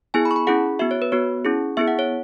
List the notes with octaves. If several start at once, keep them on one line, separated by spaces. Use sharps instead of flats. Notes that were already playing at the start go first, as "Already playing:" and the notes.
B3 E4 G#4 G#5
B5
C#6
B5
C#4 E4 G#4 F#5
B3 F#4 E5
C#5
B4
B3 F#4 C#5
C#4 E4 G#4
B3 E4 G#4 E5
F#5
C#5